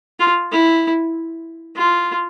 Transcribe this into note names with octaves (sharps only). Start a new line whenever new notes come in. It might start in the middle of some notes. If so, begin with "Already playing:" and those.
F4
E4
F4